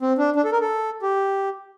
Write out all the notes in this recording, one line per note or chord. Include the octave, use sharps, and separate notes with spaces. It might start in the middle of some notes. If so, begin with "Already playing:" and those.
C4
D4
D4
A4
A#4
A4
G4